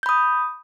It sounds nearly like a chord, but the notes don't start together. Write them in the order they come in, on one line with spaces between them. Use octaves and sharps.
G6 B5 D#6